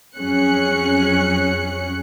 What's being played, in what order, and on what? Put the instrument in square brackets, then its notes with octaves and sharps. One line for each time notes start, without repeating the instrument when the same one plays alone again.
[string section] F2 F#3 C#4 G#4 F#6 C#7